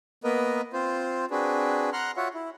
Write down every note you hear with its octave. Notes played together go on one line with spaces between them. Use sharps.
A#3 B3 A#4 B4 D#5
C4 F4 C5
C4 D4 F#4 G#4 B4
F#5 A#5 C6 F6 F#6
F4 F#4 C#5 E5 F#5
E4